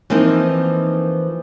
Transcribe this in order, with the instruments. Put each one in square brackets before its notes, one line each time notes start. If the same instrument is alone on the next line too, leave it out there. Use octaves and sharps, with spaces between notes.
[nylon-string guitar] E3 F3 A#3 C4 D#4